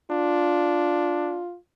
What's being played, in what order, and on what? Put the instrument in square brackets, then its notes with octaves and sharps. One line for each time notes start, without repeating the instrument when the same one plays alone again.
[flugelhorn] D4 [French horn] F4